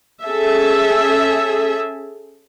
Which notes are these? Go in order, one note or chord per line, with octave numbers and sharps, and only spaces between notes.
C#4 G#4 A4 E5